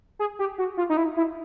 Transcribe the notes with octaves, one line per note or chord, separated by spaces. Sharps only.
G#4
G4
F#4
F4
D#4
E4
E4